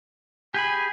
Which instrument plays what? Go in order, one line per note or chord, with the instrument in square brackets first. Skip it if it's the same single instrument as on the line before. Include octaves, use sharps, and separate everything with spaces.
[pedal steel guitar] G4 G#4 B5 [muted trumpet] G#5